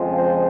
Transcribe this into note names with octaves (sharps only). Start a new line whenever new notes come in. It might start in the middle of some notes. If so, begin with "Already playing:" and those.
Already playing: F2 C#3 F3 G#3 C4
C5